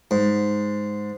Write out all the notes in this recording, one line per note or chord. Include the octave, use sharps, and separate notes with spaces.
G#2